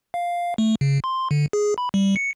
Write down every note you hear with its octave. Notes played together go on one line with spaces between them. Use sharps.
F5
A3
C#3
C6
D3
G#4
B5
G3
C#7